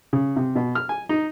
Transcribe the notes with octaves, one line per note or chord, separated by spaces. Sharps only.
C#3
C3
B2
F6
G#5
D#4